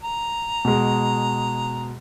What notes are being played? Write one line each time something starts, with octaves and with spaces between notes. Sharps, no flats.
A#5
B2 G#3